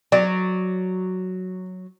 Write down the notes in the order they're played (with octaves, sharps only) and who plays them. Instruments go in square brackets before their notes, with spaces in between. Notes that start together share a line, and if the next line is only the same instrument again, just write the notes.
[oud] F#3 [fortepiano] D5